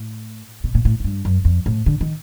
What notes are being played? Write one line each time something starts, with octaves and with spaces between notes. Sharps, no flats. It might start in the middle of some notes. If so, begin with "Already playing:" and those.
Already playing: A2
B2
A#2
A2
G#2
G2
F#2
F2
A2
D3
D#3